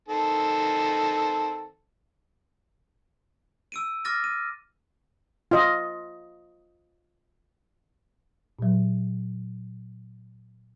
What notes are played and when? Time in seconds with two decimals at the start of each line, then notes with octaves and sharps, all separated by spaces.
0.08 D#3 C4 A4
3.72 E6 D7 D#7
4.05 D6 F6 A6 A#6 D#7
4.24 D#7
5.51 F4 D#5
8.59 A#2 F#3